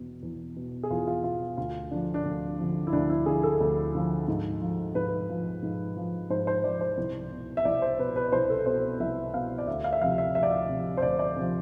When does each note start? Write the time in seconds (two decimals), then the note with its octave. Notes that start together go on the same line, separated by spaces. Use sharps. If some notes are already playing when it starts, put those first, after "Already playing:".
Already playing: E2 B2
0.22 E2
0.56 B2
0.83 G#4
0.90 E2 F4
1.07 F4
1.24 B2 F4
1.57 D2 F4
1.91 D3 F3 D4
2.14 D4
2.25 D2
2.59 D3 F3
2.87 E4
2.92 D2 D4
3.10 E4
3.26 D3 F3 G#4
3.43 A4
3.61 D2
3.94 D3 F3
4.28 G#2
4.62 F3
4.95 G#2 B4
5.29 F3
5.63 G#2
5.97 F3
6.30 G#2 C5
6.47 C5
6.64 F3 D5
6.81 C5
6.98 C2
7.31 B2
7.57 E5
7.65 C2 D5
7.82 C5
7.99 B2 B4
8.16 B4
8.32 C2 C5
8.50 A4
8.66 B2 C5
9.00 C2 E5
9.34 B2 F5
9.58 D5
9.67 D2 E5
9.84 F5
9.93 E5
10.01 C3 F3 F5
10.18 E5
10.35 D2 E5
10.43 D5
10.51 E5
10.69 C3 F3
10.97 C5
11.02 D2 D5
11.19 D5
11.36 C3 F3